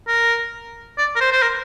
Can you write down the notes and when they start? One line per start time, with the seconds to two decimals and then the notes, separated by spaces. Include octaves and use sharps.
0.08 A#4
0.98 D5
1.16 A#4
1.21 C5
1.32 C5
1.42 A#4